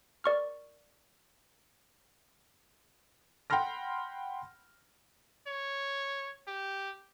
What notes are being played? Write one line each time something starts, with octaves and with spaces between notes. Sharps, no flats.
A#4 D5 C#6 F6
F#5 G5 B5 C6 F6 A#6
C#5
G4